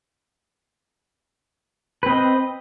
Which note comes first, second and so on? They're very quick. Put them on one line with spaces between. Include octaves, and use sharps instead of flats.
B4 C4 D#5